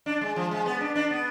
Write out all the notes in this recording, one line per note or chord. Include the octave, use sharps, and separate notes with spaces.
D4
G#3
F3
G#3
B3
D4
D4
B3